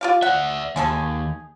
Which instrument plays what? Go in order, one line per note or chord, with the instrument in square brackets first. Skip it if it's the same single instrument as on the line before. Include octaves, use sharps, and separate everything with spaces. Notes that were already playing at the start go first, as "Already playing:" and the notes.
[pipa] F4 G4 F5
[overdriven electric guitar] D5 E5 [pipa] F#5
[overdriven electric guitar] D#2 [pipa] G#3 G#4 A4